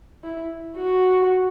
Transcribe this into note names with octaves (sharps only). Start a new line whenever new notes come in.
E4
F#4